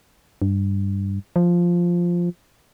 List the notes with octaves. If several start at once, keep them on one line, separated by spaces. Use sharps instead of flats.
G2
F3